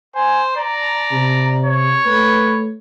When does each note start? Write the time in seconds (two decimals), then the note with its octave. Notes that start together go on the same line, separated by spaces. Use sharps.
0.15 C5 G#5
0.57 D5 A#5
1.12 C3
1.65 C#5
2.06 A3 B4